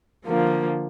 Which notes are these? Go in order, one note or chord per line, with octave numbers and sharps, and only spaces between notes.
D3 F3 A#3